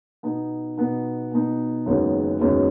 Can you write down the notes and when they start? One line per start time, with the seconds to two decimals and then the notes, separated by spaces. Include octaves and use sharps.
0.23 B2 B3 D#4
0.77 B2 B3 D#4
1.32 B2 B3 D#4
1.86 F#1 F#2 D#3 G#3 B3
2.41 F#1 F#2 D#3 G#3 B3